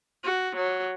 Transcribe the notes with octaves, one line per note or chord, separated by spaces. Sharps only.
F#4
F#3